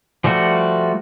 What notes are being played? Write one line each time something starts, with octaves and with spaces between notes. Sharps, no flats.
F3 G3 A3 F#4